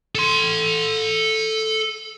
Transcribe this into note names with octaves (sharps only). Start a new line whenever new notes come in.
A4 C6